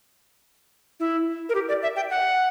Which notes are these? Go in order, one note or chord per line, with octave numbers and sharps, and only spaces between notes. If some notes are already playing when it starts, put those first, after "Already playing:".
E4
A#4
G4
D5
E5
G5
F#5